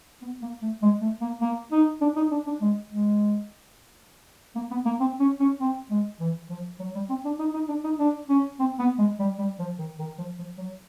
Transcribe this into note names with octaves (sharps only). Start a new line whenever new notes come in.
B3
A#3
A3
G#3
A3
A#3
A#3
D#4
D4
D#4
D4
D4
G#3
G#3
A#3
B3
A#3
C4
C#4
C#4
C4
G#3
E3
F3
F#3
G3
C4
D4
D#4
D#4
D4
D#4
D4
C#4
C4
B3
G#3
G3
G3
F3
D#3
D#3
F3
F3
F#3